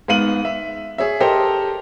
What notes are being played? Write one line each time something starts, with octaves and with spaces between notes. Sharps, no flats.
G#2 B3 F5 D#7 F#7
E5
G#4 C#5 E5
G4 A4 A#4 C5 D#5 G5